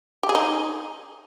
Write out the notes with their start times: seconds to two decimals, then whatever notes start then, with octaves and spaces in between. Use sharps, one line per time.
0.23 G4
0.29 G#4
0.35 D#4